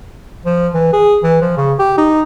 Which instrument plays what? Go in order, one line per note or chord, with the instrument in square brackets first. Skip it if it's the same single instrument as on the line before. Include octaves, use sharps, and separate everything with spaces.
[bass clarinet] F3
E3
G#4
E3
F3
C#3
G4
D#4